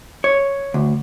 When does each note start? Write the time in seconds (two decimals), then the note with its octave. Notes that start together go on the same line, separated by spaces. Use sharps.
0.24 C#5
0.74 D2